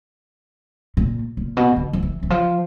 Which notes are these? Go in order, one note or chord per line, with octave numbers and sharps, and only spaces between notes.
A#2
A#2
B2
D3
F3
E3
E3
F3